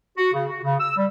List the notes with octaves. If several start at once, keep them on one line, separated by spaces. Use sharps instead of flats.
F#4
C#3
F#4
C#3
E6
G3